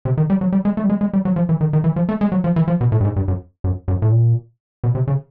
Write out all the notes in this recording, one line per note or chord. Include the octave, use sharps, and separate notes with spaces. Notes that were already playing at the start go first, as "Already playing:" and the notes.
C3
D#3
G3
F#3
G3
G#3
A3
G3
G#3
G#3
G3
F#3
F3
E3
D#3
D#3
E3
F3
A3
G#3
F#3
F3
E3
F3
B2
A2
G2
G#2
G2
F#2
F#2
F#2
A2
A#2
B2
C3
C#3